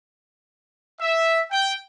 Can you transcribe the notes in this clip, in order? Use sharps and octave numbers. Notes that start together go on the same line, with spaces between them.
E5
G5